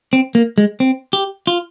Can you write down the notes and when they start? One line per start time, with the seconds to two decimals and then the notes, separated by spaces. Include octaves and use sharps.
0.13 C4
0.35 A#3
0.58 G#3
0.80 C4
1.13 G4
1.47 F4